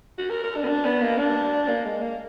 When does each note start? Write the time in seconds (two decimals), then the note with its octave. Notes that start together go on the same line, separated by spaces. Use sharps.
0.18 F#4
0.30 A#4
0.44 A#4
0.56 D4
0.64 B3
0.68 D4
0.85 B3
1.01 A#3
1.18 D4
1.68 A#3
1.85 G#3
2.01 A#3